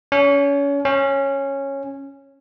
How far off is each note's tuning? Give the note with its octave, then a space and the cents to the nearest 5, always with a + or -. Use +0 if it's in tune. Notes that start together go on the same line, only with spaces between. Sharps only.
C#4 +30
C#4 -10